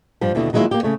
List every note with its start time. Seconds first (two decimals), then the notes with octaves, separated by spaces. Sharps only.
0.21 G2 F3 G3
0.35 D#2 B2 D3 E4
0.53 D#3 F#3 G#3 A#3 E4 F4
0.71 A#3 G4
0.83 C#3 A3 C#5